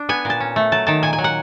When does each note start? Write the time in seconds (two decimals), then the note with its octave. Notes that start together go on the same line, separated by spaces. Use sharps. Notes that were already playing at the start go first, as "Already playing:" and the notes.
Already playing: D4
0.09 B3 G#5
0.25 A#2 A5
0.40 C#4
0.56 A3
0.72 F#3 A5
0.87 D#3 A5
1.03 A#2 G#5
1.13 G#5
1.18 F#3
1.24 F#5